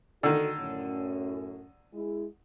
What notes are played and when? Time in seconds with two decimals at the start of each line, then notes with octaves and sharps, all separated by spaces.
0.23 D3 D#3 F#4 A4
0.59 F#2 A2 C#4
1.93 G#3 E4 G#4